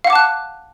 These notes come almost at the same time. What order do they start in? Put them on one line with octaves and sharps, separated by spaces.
F5 F#5 D6 A5 F#6